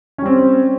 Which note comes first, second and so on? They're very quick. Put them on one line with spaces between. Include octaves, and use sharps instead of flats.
C#4 G3 C4